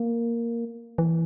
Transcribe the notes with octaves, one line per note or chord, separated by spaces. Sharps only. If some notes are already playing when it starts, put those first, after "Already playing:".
Already playing: A#3
E3